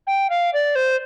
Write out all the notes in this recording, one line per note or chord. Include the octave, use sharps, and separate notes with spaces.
G5
F5
D5
C5